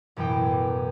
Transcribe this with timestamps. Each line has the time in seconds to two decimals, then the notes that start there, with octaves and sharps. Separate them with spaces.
0.17 A1 F#2 B2 E3 G5 D6